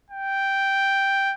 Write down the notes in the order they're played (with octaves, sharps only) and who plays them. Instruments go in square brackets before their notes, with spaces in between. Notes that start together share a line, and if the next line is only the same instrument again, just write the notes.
[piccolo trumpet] G5